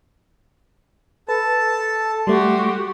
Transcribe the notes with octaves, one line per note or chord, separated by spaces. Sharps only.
A4 B4 A5
G3 A3 F#4 G4 C6